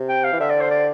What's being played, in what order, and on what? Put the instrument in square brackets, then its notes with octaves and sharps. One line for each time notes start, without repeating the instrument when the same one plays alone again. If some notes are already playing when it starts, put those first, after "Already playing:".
Already playing: [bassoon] C3
[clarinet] G5
F5
[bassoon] E3
[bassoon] D3 [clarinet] E5
[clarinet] D5
C5
D5